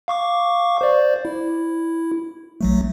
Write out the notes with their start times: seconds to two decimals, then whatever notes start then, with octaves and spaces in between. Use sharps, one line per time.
0.08 F5 C#6 D6
0.81 C5 D5
1.25 E4
2.61 A#1 F#3 A3